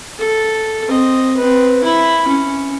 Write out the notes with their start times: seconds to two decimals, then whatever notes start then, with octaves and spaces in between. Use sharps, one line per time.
0.18 A4
0.88 C4 D#5
1.37 C4 B4
1.84 E4 B5
2.28 C#4